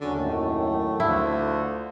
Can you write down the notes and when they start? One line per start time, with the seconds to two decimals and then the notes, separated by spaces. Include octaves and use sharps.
0.01 D#2 D3 F#3 C#4 F#4
0.15 F#2 A2 D#3 A3
1.00 D2 D3 D4 E4 F4